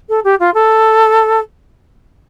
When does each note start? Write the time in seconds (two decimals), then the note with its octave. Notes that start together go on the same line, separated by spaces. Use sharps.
0.09 A4
0.24 G4
0.40 F4
0.54 A4